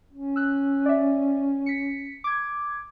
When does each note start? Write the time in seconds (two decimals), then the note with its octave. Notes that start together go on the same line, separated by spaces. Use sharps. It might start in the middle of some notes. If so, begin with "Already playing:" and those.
0.13 C#4
0.36 E6 F#6
0.86 D5 E5
1.66 B6 C#7
2.24 D6 G#6